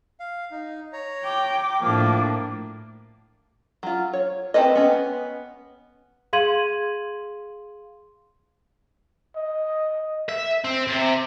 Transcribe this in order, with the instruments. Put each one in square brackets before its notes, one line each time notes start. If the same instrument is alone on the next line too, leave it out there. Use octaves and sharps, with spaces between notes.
[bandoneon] F5
D#4
C#5 A#5
[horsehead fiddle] G5 [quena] D6
[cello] A2 [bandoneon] F3 [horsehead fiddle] A#3 D4
[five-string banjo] F#3 F4
C#5
C4 C#4 A4 B4 D#5
B3 C#4
[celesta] G#4 F5 C6 G#6 D#7 F#7
[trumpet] D#5
[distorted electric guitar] E5
C4
C3